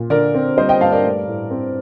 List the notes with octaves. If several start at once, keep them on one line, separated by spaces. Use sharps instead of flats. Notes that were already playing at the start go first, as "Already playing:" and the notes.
Already playing: A#2
D3 A#4 D5
C4
G3 C5 D#5
D#5 G5
G2 F5 A5
A#4 D5
A3
A2
C4